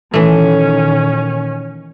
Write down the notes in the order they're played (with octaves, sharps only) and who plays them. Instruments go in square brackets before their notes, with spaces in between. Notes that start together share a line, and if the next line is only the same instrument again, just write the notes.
[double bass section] A#2 D#3 [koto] E3 A3 [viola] C#4